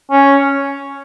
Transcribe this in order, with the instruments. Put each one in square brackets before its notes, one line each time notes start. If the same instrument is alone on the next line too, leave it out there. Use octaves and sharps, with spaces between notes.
[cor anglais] C#4